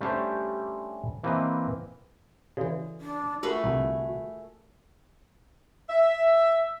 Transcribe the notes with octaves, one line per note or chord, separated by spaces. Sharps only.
G3 A3 C#4 D4 G4 C5
E3 A#3 C4 B4 D#5
C#3 E3 F#4 A4 D5
D4
A3 F4 F#4 G#4 A#4 B4 C#6
C2 D3
E5